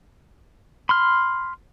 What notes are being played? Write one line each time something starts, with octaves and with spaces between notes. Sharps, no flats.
B5 C6 F6